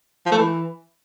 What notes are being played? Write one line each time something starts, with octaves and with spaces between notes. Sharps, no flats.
F3
A3
E3